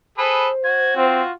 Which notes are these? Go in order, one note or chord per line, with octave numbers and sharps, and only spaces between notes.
G#4 A4 B4 C5 B5
F#4 G#6
C4 F4